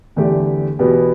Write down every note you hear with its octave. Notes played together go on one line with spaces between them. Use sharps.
E2 D3 A3 G4
E2 B2 B3 G4